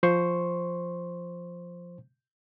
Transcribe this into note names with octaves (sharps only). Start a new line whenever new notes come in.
F3 C5 C6 C#6